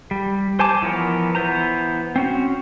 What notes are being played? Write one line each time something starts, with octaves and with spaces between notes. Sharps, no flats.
G3
C5 G#5 A5 D6
E3 F3 B3 A#4 C#5
E3 B3 C5 A#5
C4 C#4 F#4